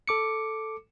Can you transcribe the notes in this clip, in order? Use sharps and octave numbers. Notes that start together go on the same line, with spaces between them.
A4 D6 C#7